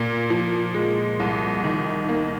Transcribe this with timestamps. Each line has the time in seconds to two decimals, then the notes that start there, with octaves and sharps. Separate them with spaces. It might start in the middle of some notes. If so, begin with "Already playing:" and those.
Already playing: A#2
0.30 F3
0.74 G#3
1.20 C2
1.64 D#3
2.08 A#3